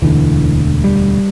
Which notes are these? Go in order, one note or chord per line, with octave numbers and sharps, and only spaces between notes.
E1 D2 D3 E3
G3